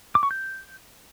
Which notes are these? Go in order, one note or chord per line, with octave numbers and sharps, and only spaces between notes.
D6
C#6
G6